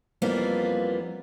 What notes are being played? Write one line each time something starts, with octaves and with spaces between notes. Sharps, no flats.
F2 E3 G3 A#3 B3 F4